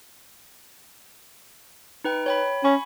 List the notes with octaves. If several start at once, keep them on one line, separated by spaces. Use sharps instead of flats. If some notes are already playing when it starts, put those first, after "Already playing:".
D#4 B4 G5
C#5 G5 B5
C#4 G#5 B5 C#6